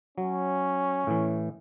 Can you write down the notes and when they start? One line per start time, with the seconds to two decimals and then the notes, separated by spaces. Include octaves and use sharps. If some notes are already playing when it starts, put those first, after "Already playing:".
0.18 F#3 C#4
1.07 A2 E3